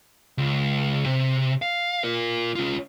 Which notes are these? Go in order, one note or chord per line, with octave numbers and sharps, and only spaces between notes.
C#2
C3
F5
F4 A#4
C#4 F4